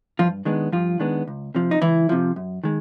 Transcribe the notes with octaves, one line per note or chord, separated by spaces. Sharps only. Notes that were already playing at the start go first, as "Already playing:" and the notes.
G2 F3 F4
D#3 G#3 B3 D4
G2 F3 F4
D#3 G#3 B3 D4
C#2
C3 F3
D#4
C#2 E3 E4
C3 F3
F#2
D#3 G#3